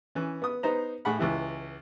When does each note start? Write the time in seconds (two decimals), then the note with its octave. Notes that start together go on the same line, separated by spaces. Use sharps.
0.15 E3 C#4
0.42 B3 D#6
0.63 B3 D#4 C5 A#5
1.05 A2 G#4 F#5 B5
1.18 C#2 E3 E4 G4